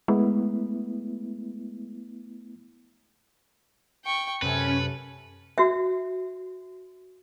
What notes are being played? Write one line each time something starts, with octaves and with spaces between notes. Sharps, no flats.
G#3 A3 B3 E4
G5 C#6
F#2 C3 C#4 A4 B4
F#4 E5